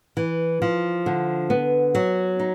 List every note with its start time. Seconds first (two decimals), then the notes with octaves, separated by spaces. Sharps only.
0.17 E3
0.62 F3
1.06 D3
1.50 B3
1.95 F#3
2.39 D#4